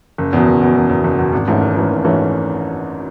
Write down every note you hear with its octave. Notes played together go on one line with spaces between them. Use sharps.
F#1
E2 B2
F#1
E2 B2
F#1
E2 B2
F#1
E2 B2
G#1
G#2 E3 A3 C#4
G#1
G#2 E3 A3 C#4
G#1
G#2 E3 A3 C#4